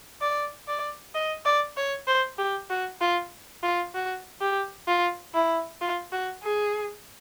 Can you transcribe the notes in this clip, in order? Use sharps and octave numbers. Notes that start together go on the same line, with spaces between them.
D5
D5
D#5
D5
C#5
C5
G4
F#4
F4
F4
F#4
G4
F4
E4
F4
F#4
G#4